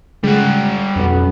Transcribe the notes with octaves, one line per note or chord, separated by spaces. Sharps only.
C#3 G3 G#3 F#5
B1 F2 B3 C#4